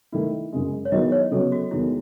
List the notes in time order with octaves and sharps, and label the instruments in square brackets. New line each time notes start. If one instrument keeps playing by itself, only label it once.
[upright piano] D#3 A3 E4
F#2 C#3 G#3
[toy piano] C#5
[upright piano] D#3 F#3 B3 E4 G#4 [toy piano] D#5
[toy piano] C#5
[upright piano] C#3 F#3 B3 [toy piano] A4
[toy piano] F#4
[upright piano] E2 D#3 G#3 [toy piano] E4